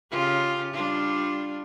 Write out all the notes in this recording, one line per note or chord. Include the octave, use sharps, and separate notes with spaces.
C#3 F4 G4
G3 D4 F4